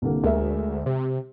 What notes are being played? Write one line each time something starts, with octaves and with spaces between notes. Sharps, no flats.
C2 D3 A#3
D2 G#3 A#4 E5
C3 G4